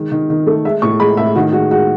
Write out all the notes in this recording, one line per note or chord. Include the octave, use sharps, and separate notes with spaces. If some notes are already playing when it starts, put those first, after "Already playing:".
Already playing: D#3 G#3
D#3
D#3
A3
G#3 E5
A2 C#6
G#3 B5
A2 E5
D#3 F#4
G#3 F#4
G#3 F#4